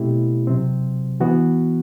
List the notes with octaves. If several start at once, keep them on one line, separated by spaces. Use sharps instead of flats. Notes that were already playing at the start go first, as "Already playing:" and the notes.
Already playing: B2 A3 C4 E4 G4
C3 F#3 C4
E3 B3 F#4